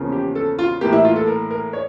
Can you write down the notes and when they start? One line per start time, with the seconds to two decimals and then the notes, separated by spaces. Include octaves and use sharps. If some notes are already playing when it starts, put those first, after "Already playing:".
Already playing: E2 C#3 F3 A#3 C#4
0.12 G4
0.35 A4
0.59 F4
0.81 A2 E3 A#3 G4
0.93 E4
1.05 F4
1.16 A4
1.27 A#4
1.51 A#4
1.73 C#5